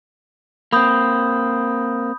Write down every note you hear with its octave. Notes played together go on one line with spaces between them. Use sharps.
A#3 C4 B5 D#6 G6